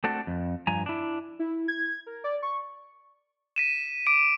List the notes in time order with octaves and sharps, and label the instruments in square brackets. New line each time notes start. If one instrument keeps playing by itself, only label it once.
[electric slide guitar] A3 C4 D4 F#4 A4
F2
G2 F3 G#5 A#5
D4 E4
[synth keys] E4
G#6
A#4
D5
C#6
[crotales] B6 D#7 E7
D6 D7